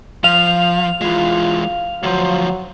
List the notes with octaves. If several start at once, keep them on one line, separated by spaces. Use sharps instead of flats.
F3 F5 F7
E3 G#3 F4
D2 F3 F#3